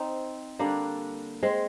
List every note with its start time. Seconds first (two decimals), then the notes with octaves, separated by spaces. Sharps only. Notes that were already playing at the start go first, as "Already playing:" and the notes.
Already playing: C4 D#4
0.59 D3 G3 A#3 D4
1.43 G#3 C4